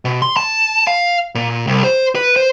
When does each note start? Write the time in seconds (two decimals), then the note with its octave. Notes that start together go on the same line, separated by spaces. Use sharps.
0.05 B2
0.22 C6
0.37 A5
0.87 F5
1.35 A#2
1.67 C2
1.84 C5
2.15 B4
2.36 C5